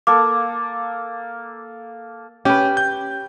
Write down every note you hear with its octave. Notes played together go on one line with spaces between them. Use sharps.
A#3 A4 D6
C#4 G4 B4
G6